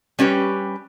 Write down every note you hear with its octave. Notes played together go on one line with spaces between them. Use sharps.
G3 C#4 G4 B4